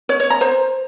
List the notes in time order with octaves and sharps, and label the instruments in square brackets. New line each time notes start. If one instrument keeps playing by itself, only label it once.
[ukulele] C#5
C#5
A#5
C5